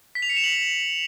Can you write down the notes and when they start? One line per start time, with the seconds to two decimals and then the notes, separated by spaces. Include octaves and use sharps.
0.15 B6
0.22 F7
0.30 C#7
0.37 E7
0.44 F#7